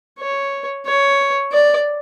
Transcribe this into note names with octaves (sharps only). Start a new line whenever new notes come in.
C#5
C#5
D5